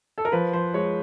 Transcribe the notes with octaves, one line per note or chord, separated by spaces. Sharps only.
A4
A#4
F3 B4
F3 C5
G#3 C#5